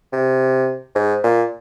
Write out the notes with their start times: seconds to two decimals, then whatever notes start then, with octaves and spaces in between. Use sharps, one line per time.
0.13 C3
0.95 G#2
1.24 A#2